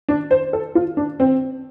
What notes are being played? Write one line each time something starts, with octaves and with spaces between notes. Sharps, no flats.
D4
C5
A4
F4
D4
C4